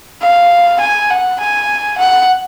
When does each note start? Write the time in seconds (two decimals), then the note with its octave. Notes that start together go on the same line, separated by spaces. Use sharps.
0.22 F5
0.80 G#5
1.10 F#5
1.40 G#5
1.98 F#5